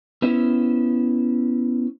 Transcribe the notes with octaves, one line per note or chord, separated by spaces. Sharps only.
B3 C#4 E4 C5 E5